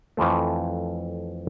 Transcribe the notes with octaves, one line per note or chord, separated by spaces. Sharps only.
F2 E3 F3 A3